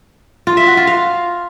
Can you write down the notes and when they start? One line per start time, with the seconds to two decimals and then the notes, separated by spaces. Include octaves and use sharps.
0.47 F4
0.57 E5
0.67 F#4
0.77 F4
0.87 F5